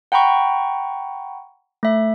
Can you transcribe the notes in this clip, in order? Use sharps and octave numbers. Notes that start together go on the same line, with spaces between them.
F#5 G5 A#5 B5 C#6
A3 E5